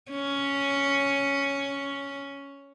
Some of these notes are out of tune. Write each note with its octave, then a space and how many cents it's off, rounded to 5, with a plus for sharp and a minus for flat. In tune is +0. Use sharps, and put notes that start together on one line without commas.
C#4 +5